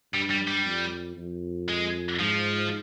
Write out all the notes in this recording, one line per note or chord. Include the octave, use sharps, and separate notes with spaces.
G2 G3
G3
G3
F2
F2
G#3
G#2 F3